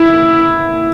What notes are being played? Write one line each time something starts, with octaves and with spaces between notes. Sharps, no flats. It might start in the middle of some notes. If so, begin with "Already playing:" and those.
Already playing: E4